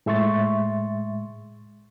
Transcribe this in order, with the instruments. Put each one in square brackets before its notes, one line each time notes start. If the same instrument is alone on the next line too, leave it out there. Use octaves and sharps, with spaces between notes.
[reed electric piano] A2 G#3 E5 C6 C#6 A6